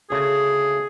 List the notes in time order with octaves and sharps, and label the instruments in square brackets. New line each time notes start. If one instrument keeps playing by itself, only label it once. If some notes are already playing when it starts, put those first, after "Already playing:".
[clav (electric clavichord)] D2 C#3 A3 [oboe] G#4